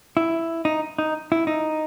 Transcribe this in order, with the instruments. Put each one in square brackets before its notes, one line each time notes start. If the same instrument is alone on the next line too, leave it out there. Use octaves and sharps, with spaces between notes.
[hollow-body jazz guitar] E4
D#4
D#4
E4
D#4